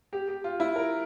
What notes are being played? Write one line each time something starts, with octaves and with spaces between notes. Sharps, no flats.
G4
G4
F4
E4
A#4